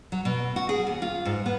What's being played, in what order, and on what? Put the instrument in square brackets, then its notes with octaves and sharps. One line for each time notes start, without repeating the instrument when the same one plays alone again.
[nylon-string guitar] F#3
B2
F#4
G#4
D#2
F4
G#2
B3